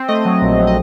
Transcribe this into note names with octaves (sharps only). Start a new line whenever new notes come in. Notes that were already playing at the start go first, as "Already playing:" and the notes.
Already playing: C4
A3 D#5
F#3
A#1
F#3
D#5